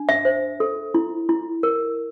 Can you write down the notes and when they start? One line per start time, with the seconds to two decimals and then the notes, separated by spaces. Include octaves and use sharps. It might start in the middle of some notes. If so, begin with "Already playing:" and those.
Already playing: D4
0.09 E5
0.25 C5
0.60 A4
0.94 E4
1.29 E4
1.63 A#4